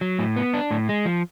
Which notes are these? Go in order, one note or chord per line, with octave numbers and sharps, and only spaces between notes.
F#3
A2
B3
D4
A2
G#3
F3